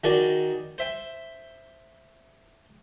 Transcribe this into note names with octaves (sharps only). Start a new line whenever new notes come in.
D#3 D#4 F#4 G#4 A#4 D5
C5 E5 G5